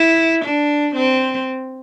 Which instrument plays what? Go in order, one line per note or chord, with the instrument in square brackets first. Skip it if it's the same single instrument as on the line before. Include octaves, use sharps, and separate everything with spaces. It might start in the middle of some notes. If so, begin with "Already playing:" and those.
Already playing: [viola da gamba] E4
D4
C4